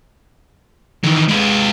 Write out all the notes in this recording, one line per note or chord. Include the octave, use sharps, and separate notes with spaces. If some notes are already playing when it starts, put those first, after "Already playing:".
D#3 E3
G#3 B4